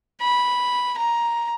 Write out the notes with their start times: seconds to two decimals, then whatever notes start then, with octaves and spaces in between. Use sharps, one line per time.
0.21 B5
0.97 A#5